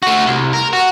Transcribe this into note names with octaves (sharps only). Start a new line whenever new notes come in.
A3 F#4
C2
A#4
F#4